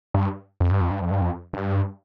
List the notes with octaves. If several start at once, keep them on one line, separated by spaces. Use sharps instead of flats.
G2
F2
G2
F2
G2
F2
G2
F2
G2